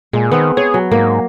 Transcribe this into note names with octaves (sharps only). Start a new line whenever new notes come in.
A#2 G#3
D#3 B3 C4
G#4 C#5
F#3
G#2 A#3